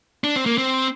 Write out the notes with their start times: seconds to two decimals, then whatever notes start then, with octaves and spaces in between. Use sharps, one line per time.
0.24 D4
0.36 C4
0.46 A#3
0.58 C4